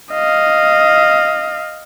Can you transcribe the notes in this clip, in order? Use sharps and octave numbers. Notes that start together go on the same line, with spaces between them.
D#5 F5